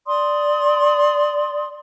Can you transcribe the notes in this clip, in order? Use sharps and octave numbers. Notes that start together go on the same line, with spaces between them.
D5 C6 D#6